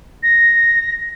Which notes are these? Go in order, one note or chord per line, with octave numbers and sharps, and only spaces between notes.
A#6